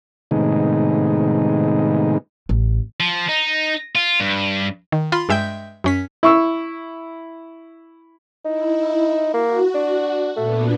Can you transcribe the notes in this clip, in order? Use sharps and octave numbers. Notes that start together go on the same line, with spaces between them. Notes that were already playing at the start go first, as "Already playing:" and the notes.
A2 C3 D#3 G#3 B3 D#4
A1
F3
D#4
F4
G2
D#3
F4 B5 C6
G2 G#3 E5 G5 G6
F#2 C#4 B6
E4 C#6 E6
D#4 E4
A#3 F#4
D4
A#2 A3 B3 D4